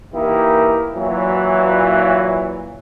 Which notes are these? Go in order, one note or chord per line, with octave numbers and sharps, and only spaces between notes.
E3 A#3 D#4 E4 G4 A#4
A#2 E3 F#3